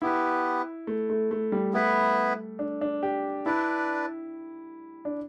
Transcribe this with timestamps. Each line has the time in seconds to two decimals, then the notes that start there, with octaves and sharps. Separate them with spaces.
0.02 B3 E4 G4 B4
0.87 A3
1.10 A3
1.31 A3
1.52 G3
1.73 A3 B3 E4 B4 E5
2.59 D4
2.81 D4
3.03 G4
3.46 D4 E4 B4 D5
5.05 D4